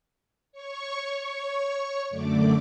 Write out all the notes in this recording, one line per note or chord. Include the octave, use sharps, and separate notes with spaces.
C#5 C#6
F#2 D3 A3 D4 D6